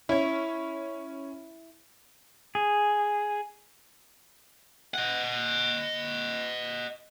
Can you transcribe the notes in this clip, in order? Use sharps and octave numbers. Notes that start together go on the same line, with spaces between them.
C#4 E4 C#5
G#4
D#5 F#5